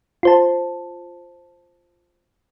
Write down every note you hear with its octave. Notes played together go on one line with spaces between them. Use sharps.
F4 C5 A5